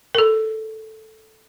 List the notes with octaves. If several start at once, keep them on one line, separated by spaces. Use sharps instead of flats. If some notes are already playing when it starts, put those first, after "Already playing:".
A4 A#4